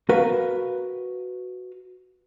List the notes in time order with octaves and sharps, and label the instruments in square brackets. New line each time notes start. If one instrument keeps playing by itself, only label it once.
[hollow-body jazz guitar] F#4 A#4 B4 F5